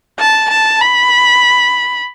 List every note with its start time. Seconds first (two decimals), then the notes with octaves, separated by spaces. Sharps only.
0.19 A5
0.50 A5
0.81 B5